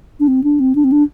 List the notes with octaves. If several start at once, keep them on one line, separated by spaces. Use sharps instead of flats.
D4
C4
D4
C4
D4
C4
D4